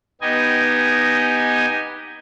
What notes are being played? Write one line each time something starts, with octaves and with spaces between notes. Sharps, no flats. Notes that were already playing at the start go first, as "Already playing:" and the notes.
B3 D#4 G4 D#5 G#5